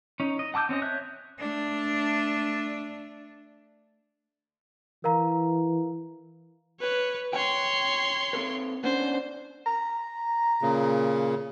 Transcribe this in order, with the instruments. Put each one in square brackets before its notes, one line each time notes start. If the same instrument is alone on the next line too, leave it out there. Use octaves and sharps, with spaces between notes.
[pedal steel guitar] C#4 D#4
D#5
F#5 A5 D6 E6 G6
C4 C#4 C5 D#5
C#5 E5 F#6 G6
[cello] A3 D4
[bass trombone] E3 [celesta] A#4 F5 A#5
[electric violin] B4 C#5
[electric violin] C#5 C6 [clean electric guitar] G5
[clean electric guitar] C4 A4 B4
[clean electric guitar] B3 C#4 D4 [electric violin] C5
[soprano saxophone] A#5
[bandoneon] A#2 C#3